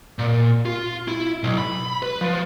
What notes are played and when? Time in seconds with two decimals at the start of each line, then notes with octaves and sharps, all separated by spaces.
0.19 A#2
0.66 F4
1.08 E4
1.43 B1
1.58 B5
2.03 B4
2.21 F3